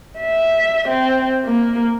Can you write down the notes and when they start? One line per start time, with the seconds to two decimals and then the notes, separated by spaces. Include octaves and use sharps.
0.19 E5
0.89 C4
1.46 A#3